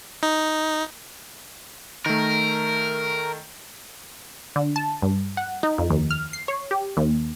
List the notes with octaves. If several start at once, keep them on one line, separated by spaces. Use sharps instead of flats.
D#4
D#3 A3 A#4
D3
A5
G2
F#5
D#4
F2
D#2
F6
C7
C#5
G4
D#2